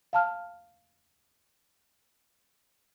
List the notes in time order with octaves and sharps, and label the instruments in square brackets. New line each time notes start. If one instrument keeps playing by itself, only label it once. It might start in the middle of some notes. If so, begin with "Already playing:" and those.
[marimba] F5 A5 F6